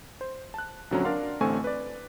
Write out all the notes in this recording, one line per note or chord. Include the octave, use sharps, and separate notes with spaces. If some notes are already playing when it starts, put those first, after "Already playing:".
C5
A5 F#6
A#1 D3 F#3 C4 C#4 A#5
D4 A#4 D5 F5 F#5 C6
A1 D3 A3 C4 G#5 C#6
B4 D5